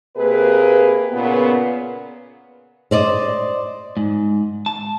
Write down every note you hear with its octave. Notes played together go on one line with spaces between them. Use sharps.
C3 A#3 G#4 B4
A#2 C#3 B3
C5 D5 D#5
G#2
A5